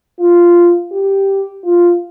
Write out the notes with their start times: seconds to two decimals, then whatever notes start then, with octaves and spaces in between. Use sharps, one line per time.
0.19 F4
0.92 G4
1.64 F4